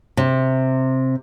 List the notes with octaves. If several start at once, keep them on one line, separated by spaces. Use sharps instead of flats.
C3